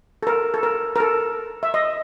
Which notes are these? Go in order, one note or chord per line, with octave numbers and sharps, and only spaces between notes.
A4
A#4
A4
A#4
A#4
A4
E5
D#5